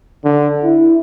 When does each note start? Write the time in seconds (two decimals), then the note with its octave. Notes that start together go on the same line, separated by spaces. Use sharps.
0.24 D3
0.63 E4